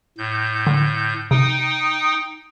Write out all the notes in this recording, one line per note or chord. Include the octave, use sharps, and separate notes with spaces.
A2 G6
D3
C3 D#4 G5 D#6